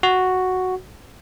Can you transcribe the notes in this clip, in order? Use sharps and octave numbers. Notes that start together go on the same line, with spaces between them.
F#4